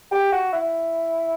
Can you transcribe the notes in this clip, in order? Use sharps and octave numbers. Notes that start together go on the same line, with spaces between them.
G4
F#4
E4